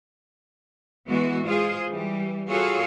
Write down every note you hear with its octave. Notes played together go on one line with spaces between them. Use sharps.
E3 G#3 B3 F#4
G#3 F4 G#4 C5
E3 G3
F4 F#4 G#4 A4 C#5 F5